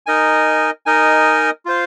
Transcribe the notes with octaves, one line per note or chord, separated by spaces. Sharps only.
D#4 A#4 D#5 G#5
D#4 A#4 D#5 G#5
F4 C5 F5